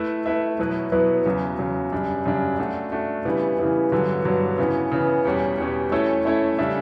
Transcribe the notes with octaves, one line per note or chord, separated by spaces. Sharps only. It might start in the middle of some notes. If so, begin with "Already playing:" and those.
Already playing: A3 E4 B4 E5
A3 E4 B4 E5
B2 F#3 B3 E4 B4
B2 F#3 B3 E4 B4
E2 C#3 F#3
E2 C#3 F#3
F#2 C#3 G3 D4
F#2 C#3 G3 D4
A3 D4 F#4
A3 D4 F#4
C#3 E3 G3 B3 E4
C#3 E3 G3 B3 E4
G2 D3 F#3 B3
G2 D3 F#3 B3
C#3 E3 B3
C#3 E3 B3
E2 B2 G3 C#4 G4
E2 B2 G3 C#4 G4
A3 C#4 E4 A4 C#5
A3 C#4 E4 A4 C#5
C#3 G3 D4 A4 E5